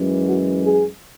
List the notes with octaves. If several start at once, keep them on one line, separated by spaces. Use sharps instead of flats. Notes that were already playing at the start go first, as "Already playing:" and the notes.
Already playing: F#2 E3 G#3
F#4
G#4